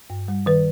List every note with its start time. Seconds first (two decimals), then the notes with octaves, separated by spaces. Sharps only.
0.10 G2
0.28 G3
0.46 D#3 B4